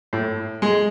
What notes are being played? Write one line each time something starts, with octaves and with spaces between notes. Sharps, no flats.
A2
G#3